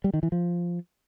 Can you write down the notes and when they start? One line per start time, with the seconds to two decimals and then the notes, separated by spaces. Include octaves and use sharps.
0.04 G3
0.14 D#3
0.23 E3
0.32 F3